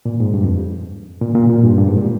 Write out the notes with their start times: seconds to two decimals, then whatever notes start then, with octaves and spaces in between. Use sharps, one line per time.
0.05 A#2
0.20 G#2
0.34 G2
0.44 F2
1.21 A#2
1.35 A#2
1.49 A#2
1.63 G2
1.78 G2
1.88 G#2
1.97 A#2